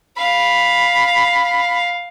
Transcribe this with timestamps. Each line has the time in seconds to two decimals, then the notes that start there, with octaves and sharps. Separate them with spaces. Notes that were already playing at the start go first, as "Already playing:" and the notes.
0.17 F5 B5